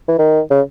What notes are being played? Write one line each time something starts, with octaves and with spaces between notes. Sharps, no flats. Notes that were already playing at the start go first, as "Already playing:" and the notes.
E3
D#3
C#3